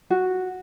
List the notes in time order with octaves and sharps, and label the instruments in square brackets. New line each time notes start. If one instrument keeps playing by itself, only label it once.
[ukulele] F#4